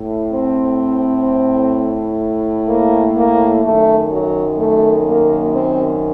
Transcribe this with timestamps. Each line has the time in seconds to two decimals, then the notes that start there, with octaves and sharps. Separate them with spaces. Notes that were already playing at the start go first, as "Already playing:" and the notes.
Already playing: A2
0.33 C4
2.68 A#3
3.16 A#3
3.63 F#2 D#3 A3
4.11 F#3
4.57 A3
5.05 A#3
5.52 C4